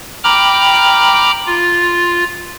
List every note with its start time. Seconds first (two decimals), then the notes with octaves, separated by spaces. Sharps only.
0.24 G5 A#5 B5 D6 F6
1.47 F4